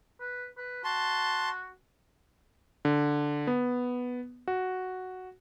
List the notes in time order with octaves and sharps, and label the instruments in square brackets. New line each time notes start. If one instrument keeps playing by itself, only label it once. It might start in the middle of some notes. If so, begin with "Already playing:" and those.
[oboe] B4
B4
[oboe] F#4 [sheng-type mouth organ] A5 C6
[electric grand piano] D3
B3
F#4